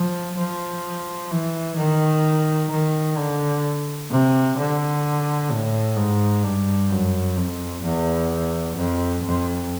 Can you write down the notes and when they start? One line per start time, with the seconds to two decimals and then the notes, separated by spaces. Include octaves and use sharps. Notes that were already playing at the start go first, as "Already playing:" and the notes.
Already playing: F3
0.37 F3
1.31 E3
1.77 D#3
2.70 D#3
3.17 D3
4.10 C3
4.58 D3
5.50 A2
5.96 G#2
6.43 G2
6.89 F#2
7.37 F2
7.83 E2
8.76 F2
9.23 F2